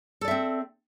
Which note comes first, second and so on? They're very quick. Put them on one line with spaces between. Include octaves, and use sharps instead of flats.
A4 D5 E5 C4